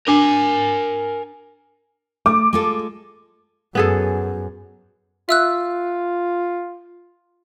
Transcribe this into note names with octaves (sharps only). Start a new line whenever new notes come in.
D4 A#4 G#5
A3 D6
G#3 F4 A4
F#2 B3 G#4 A4
F4 E5 E6 F#6